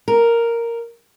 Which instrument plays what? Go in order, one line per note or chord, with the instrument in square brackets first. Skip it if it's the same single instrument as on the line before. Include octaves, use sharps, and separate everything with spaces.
[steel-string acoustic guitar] A#4